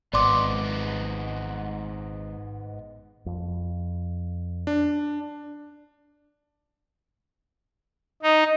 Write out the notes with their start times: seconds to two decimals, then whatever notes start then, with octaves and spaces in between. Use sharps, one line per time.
0.13 G#1 G#2 B3 D5 C6 D6
3.26 F2
4.67 D4
8.23 D#4